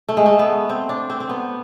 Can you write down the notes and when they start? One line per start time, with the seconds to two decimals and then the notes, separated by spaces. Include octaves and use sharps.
0.09 A3
0.17 G#3
0.26 A3
0.39 B3
0.69 C4
0.89 D4
1.10 C4
1.20 C4
1.29 B3